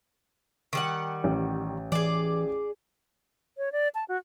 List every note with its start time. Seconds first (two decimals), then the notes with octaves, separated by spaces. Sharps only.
0.73 D#3 G3 F#5
1.24 A1
1.92 E3 G#4 D5
3.58 C#5
3.72 D5
3.95 A5
4.09 F#4